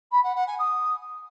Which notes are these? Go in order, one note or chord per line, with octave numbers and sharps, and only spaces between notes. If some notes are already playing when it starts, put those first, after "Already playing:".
B5
F#5
F#5
G#5
D#6